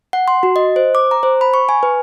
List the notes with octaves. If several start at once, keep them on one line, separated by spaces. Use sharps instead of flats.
F#5
C6
F#4
D#5
C5
D6
A#5
C5
B5
C#6
G#5
B4